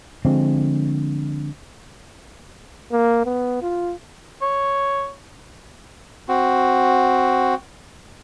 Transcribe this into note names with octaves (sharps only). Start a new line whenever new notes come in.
D3 F3 G#3 C4
A#3
B3
F4
C#5
C4 F#4